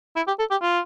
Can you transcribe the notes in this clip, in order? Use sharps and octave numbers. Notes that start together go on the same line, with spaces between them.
E4
G4
A4
G4
F4